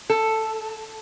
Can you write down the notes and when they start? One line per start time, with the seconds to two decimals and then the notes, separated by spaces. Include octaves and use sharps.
0.10 A4